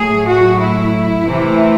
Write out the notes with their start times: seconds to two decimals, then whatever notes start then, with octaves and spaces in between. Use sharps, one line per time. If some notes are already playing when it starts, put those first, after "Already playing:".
Already playing: A2 F#3 A3 G#4
0.26 F#4
0.58 E4
1.24 C3 E3 A3